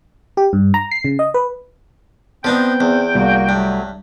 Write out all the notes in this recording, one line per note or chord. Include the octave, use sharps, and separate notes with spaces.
G4
G2
A#5
C7
C#3
D#5
B4
F3 B3 C4 D4 D#4 G5
E2
C2 A#3 F#4
G2 F#3 A3